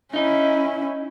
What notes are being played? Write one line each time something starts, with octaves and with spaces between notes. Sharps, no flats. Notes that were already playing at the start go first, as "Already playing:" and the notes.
C#4 D#4 E4 D#5